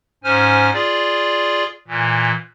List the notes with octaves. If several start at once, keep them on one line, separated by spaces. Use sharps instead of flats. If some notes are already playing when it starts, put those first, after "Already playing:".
G#2 C#4 C5 G#5 F6
F4 G#4 D5
A#2 E3